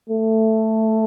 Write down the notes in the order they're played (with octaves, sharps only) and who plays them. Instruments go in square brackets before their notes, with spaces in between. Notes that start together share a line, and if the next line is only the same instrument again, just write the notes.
[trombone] A3